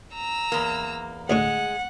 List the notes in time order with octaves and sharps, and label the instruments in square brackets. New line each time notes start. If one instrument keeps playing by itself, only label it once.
[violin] A#5 E6
[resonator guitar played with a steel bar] E2 A#3
[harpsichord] D2 A2 D3 [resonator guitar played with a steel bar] G#3 [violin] F#5